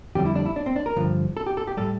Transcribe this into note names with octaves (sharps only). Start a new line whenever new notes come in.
F2 D3 G3 G4
E4
D4
E4
D4
C4
D4
A#4
G2 D3 F3
A4
G4
A4
G4
A2 G3 A4